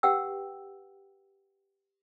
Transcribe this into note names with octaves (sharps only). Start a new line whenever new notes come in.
G4 B4 F#5 G5 E6